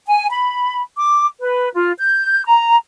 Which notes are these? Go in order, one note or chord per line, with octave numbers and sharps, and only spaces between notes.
G#5
B5
D6
B4
F4
G6
A#5